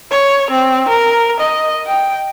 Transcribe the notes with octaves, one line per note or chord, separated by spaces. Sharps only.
C#5
C4
A#4
D#5
G5